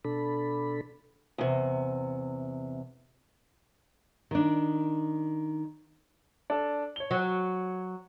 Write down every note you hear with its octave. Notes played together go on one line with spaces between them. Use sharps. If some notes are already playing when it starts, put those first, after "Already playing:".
B2 D4 A4 B5
E2 C3
D#3 D4
D4 A4
C#5 G7
F#3